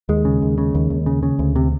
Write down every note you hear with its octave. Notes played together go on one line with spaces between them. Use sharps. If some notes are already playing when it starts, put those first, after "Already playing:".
D#2 G#3
C#3
D#2
C#3
D#2
D#2
C#3
C#3
D2
C3